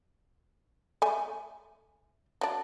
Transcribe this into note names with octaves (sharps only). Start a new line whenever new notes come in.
A3 G#5
F#3 D4